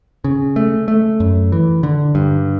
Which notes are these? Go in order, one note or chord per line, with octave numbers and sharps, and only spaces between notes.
C#3
A3
A3
F#2
E3
D3
G2